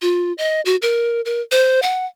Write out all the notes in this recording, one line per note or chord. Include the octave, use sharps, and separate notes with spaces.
F4
D#5
F#4
A#4
A#4
C5
F#5